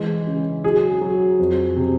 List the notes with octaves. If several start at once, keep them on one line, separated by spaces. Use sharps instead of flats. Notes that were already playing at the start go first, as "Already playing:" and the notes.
Already playing: E3 G#3
C#3
F#3 G#4
F#3
F2
C3